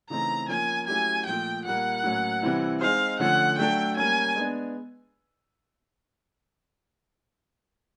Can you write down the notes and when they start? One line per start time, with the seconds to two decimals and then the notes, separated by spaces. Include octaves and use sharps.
0.10 C#3 E3 A3 C4 D#4 A#5
0.49 F3 A#3 C#4 G#5
0.87 F#3 A3 C#4 E4 G4 G#5
1.26 A#2 F3 A3 G5
1.64 A#2 G3 A#3 F#5
2.03 A2 F#3 A#3 C#4
2.42 C3 E3 G3 C4 E4
2.81 G#3 C4 D#4 G#4 C5 F5
3.19 D3 F3 A3 C#4 F#5
3.58 F#3 A3 D4 F#4 A4 G5
3.96 G3 A#3 C#4 G#5
4.35 G#3 B3 D4